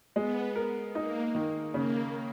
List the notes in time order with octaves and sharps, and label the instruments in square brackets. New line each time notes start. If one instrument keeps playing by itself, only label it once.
[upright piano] G#3 [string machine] B3
[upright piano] A#4
[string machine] A#3 [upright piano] D#4
[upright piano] D#3
[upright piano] C#3 [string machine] A#3